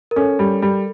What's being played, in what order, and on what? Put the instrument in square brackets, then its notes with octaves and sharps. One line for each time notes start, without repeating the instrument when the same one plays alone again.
[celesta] A#4
[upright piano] C#4 [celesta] A4
[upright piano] G3
G3